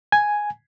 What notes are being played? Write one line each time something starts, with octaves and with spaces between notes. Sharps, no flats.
G#5